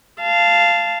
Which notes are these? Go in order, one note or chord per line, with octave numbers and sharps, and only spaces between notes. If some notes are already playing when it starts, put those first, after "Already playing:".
F5 A5